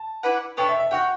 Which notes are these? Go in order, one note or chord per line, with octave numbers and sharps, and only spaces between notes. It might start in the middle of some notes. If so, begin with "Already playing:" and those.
Already playing: A5
E4 B4 D5 F#5
B3 D4 A4 C#5 G5
E5
E5
F#4 C#5 F#5 G5